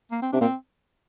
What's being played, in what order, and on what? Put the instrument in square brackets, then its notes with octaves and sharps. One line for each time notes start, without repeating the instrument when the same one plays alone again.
[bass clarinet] A#3
C4
[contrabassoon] C3 [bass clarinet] D4
[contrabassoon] A#2 [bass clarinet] C4